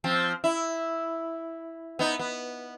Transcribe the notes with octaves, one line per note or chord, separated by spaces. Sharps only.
F3 C4
E4
B3 D#4
B3